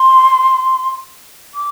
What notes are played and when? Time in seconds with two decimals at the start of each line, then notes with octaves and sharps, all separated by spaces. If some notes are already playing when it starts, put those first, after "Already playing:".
Already playing: C6
1.54 D6